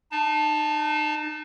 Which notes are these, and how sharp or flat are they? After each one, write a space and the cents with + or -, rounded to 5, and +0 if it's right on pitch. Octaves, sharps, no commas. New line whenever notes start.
D#4 -35 A5 +0